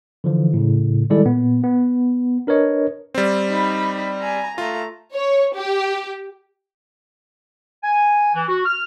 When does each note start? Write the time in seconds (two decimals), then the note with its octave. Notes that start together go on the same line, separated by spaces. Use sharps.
0.24 D3 E3 F3
0.54 A2 C#3
1.10 D#3 G3 G#3 E4 A4 D5
1.25 A#2 B3
1.64 B3
2.47 D4 A#4 B4 C#5 D#5
3.15 G3 C4
3.50 D#4 B5
4.20 G#5 A#5
4.58 A3 F4 A#5
5.14 C#5
5.57 G4
7.83 G#5
8.35 E3
8.48 F#4
8.66 F6